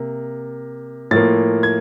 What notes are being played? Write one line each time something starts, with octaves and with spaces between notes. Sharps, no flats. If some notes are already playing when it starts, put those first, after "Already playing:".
Already playing: C3 A#3
A2 F3 A#3 A6
G#6